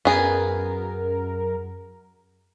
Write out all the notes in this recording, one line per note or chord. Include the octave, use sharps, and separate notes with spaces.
F#2 B3 G#4 A#4